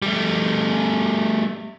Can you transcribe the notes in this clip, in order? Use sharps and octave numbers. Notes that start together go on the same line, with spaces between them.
G3 A3